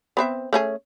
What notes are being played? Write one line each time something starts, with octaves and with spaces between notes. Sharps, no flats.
B3 C4 E5
A3 C#4 G#4